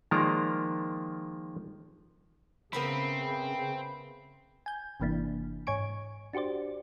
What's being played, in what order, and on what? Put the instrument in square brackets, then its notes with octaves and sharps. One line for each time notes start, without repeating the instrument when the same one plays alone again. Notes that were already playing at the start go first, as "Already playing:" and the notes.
[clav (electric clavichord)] D#3 F3 G#3 A#3 D5 A#5
[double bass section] C#3 [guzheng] B3 A#4 E5 [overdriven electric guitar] C4 [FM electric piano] B5
[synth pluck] G#5 G6
G1 C3 E3 A#3 D4 E4
G#2 C#5 G#5 C#6 D7
D4 F#4 G4 C5 D5